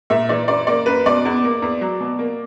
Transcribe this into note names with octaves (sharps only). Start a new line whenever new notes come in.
A#2 E5
E3 D5
F#2 D5
A#3 D5
F#2 B4
B2 D5
E2
A#3
E2
F#3
B2
A#3